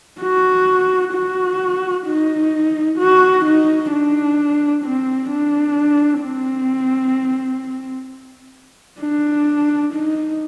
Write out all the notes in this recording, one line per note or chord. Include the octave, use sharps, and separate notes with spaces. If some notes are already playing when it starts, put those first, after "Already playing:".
F#4
F#4
D#4
F#4
D#4
D4
C4
D4
C4
D4
D#4